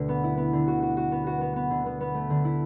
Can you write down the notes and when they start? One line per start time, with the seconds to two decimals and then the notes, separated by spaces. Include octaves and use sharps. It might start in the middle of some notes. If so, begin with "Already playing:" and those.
Already playing: D2 B2 D3
0.09 B3
0.24 E4
0.38 B3
0.53 D3
0.67 F#4
0.82 F#4
0.97 F#4
1.12 B3
1.27 F#4
1.41 B3
1.56 B3
1.70 D3
1.86 B3
2.01 B3
2.15 A3
2.30 D3
2.45 E4